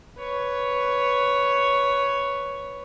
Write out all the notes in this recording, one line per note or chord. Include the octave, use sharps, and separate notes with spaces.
B4 C#5